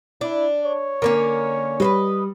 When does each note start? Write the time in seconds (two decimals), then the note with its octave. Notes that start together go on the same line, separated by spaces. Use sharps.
0.21 D4 E4
0.64 C#5
1.02 D3 A#3 C#4 A#4
1.80 G3 B4 C5 D#5